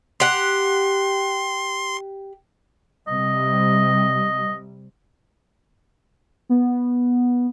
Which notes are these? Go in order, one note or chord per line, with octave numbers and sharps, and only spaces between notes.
G4 F#5 C6
C3 G3 D#5
B3